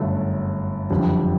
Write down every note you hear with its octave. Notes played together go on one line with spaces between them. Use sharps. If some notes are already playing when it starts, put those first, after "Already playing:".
Already playing: G1 F#2 D3 F#3 A3
F#1 F2 D3 G3